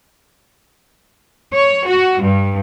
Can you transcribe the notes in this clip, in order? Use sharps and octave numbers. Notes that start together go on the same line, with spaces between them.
C#5
F#4
G2